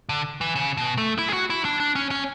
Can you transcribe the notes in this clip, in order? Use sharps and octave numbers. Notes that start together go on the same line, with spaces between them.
D3
E3
C#3
B2
A3
E4
G#4
F#4
E4
D4
D4
C#4
C#4